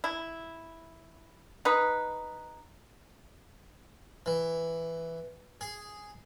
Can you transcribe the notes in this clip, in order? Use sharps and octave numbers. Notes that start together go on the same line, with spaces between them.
E4
D#4 B4
E3
G#4